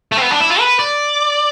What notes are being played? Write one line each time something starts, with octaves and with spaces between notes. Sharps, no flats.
A3
C4
B3
D4
E4
F4
B4
D5